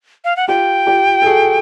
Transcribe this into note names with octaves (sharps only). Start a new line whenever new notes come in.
F5
F#5
F4 G4 G5
F4 G4
A4
F#4 G#4